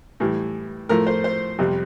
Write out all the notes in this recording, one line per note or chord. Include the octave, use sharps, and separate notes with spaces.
A2 E3 G3
A2 F3 A3 A#4
C5
C5
F2 C3 G3